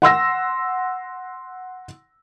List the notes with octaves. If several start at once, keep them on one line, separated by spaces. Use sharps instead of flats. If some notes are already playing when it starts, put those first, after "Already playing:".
F#5 C6 E6 A#6